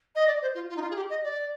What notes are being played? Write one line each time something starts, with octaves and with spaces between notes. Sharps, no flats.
D#5
D5
C5
F4
F4
D#4
F4
G#4
G4
D#5
D5